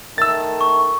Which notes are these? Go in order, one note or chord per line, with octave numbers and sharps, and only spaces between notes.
D#3 A3 E6 A6
C#6